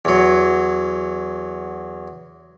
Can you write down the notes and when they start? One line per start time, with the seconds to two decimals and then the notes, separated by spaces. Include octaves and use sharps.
0.05 E2 F#3